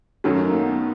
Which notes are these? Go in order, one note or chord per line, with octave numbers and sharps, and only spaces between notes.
F#2 D#3 F#3 A3 C#4
A#3
B3